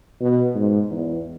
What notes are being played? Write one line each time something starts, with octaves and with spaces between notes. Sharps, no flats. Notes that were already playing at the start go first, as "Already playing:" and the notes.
B2
G#2
E2